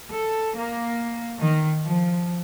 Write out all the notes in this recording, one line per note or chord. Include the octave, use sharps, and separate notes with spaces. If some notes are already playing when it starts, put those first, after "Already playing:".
A4
A#3
D#3
F3